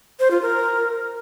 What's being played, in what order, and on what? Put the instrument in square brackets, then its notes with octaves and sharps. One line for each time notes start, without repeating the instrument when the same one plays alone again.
[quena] C5
F4
A#4